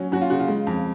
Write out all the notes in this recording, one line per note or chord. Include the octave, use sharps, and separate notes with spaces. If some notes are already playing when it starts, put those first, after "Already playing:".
Already playing: F#3 C#4 F#4
F#2 F#4
F4
C#3 F#4
F4
G#3
F2